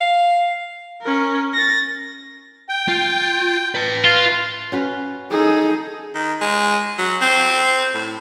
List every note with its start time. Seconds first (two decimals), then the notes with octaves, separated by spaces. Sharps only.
0.01 F5
1.03 C#4 A#4
1.54 A6 A#6
2.69 G5
2.88 F4
3.75 B4 A5
4.04 F4
4.72 C#4 F#4 B4
5.31 D#4 G#4 A4
6.15 D#3
6.41 G#3
6.98 F#3
7.21 C4
7.94 A2